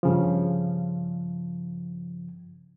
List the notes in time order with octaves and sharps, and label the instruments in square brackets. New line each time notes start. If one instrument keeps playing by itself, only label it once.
[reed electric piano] G2 C#3 F3